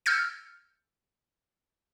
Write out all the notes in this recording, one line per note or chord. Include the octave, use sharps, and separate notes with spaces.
E6 F6 G6 A6 C#7